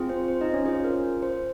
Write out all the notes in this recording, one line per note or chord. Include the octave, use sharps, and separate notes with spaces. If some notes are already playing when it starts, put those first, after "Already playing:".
Already playing: C4 F4 G#4
C5
C5
D#4 D#5
C#4 C#5
C#4 F4 G#4 C5
A#4
C5